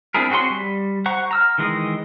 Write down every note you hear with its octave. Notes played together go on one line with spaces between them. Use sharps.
C4 D4 E4 G#4 A#4
C4 F#4 G#4 C#5 C6
G3
C5 F#5 A#5 C#6
A#5 E6 F6
D#3 E3 G#3 D#5